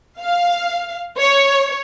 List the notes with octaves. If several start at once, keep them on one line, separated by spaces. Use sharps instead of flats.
F5
C#5